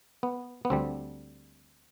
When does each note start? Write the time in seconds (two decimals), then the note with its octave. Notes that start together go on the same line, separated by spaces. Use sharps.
0.23 B3
0.65 B3
0.70 D2 D3 G3 C4